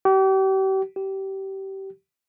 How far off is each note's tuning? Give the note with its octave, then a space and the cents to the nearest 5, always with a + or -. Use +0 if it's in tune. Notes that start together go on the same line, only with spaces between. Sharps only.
G4 -40
G4 -25